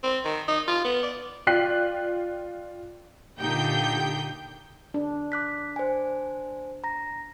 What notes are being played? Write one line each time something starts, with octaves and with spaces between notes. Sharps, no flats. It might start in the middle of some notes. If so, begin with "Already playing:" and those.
C4
D#3
D#4
F4
B3
D5
F4 D5 G5 F#6 C7
A#2 D3 D#4 G4 G5 G6
D4
D6 F#6 B6
C5 G#5
A#5 A#6